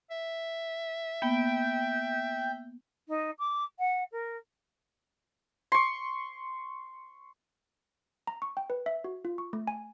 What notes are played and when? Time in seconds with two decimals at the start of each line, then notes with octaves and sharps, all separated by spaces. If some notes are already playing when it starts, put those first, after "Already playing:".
0.11 E5
1.22 A#3 B3 G5
3.08 D#4
3.39 D6
3.79 F#5
4.12 A#4
5.72 C6 C#6
8.27 A#5
8.42 C#6
8.57 G5
8.70 B4
8.86 E5
9.04 F#4
9.25 F4
9.38 C#6
9.53 A3
9.67 G#5